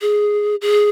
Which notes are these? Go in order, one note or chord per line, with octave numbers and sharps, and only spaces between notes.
G#4
G#4